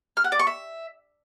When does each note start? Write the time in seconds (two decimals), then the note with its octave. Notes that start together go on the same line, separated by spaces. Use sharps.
0.17 F6
0.24 F#5
0.32 D5
0.39 C#6
0.47 E5